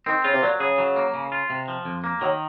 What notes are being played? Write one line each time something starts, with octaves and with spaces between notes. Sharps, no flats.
D#3 C4
C#3 F4
C3
A#2 F#3
C#3 G#4
F#3
A#3
C#3
F4
C3
F3
F2
A#3
D#3 F#3